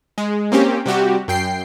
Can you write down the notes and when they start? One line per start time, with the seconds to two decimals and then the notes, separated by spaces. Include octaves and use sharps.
0.18 G#3
0.52 A#3 C4 C#4 G4
0.86 C3 G3 F#4 G4
1.28 F#2 G5 C7